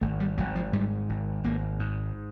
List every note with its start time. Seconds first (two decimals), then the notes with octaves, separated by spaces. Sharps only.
0.01 G#1 A3
0.20 G3
0.38 G#1 F#3
0.55 F3
0.73 G#2 G3
1.09 G#1
1.44 G#1 A#3
1.80 G#2